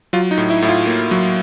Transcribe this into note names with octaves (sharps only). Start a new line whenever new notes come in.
F#3 F4
D#4
A2
E4
A2 E4
F4
A#3
F#3